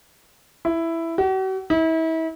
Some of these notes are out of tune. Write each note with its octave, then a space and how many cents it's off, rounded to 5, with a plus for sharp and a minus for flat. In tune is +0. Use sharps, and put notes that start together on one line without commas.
E4 +5
F#4 +45
E4 -35